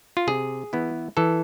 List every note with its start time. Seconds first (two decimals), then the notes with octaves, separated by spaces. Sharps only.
0.17 F4
0.27 C3 G#4
0.73 E3 B3 E4
1.17 E3 A4